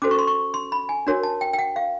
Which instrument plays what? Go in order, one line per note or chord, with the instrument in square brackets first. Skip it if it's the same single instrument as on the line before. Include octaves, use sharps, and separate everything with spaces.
[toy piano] C#4 F#4 A4 C5 D6
C#6
C6
C#6
C6
B5
G#5
D4 F#4 A#4 C#5
A5
G5
G5
F#5
F5